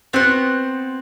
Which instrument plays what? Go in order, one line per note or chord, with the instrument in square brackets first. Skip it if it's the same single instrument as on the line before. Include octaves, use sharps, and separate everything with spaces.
[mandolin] B3 F#4 C5 F#5 [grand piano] C4